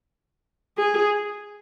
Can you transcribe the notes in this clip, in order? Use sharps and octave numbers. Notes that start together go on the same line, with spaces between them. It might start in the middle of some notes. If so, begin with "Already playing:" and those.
G#4